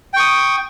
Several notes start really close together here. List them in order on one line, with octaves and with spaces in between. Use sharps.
G5 C#6 D#6